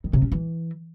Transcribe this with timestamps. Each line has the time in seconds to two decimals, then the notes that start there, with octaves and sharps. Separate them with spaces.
0.04 D#3
0.13 C3
0.22 C#4
0.32 E3